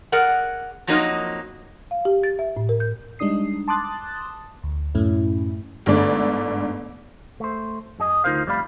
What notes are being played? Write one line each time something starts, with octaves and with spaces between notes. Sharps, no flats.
G#4 A#4 D5 F#5
F2 F3 F#3 A#3 D#4 D#5
F5
G4
A6
E5
A2
A#4
G6
G3 G#3 D4 D#4 D#6 C7
A5 C6 D6 D#6 F#6 A6
D2
F#2 A2 A3 C#4 E4
G1 G#2 D3 A3 D5
A3 C5
F#2 G#4 D#5
D2 D#4 F4 A#4 C5 F5
F2 G3 A3 D5 F5 B5